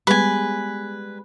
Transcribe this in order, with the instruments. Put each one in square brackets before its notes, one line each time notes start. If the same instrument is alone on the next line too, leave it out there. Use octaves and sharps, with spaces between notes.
[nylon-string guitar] G3 G#3 B3 [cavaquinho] B4 G#5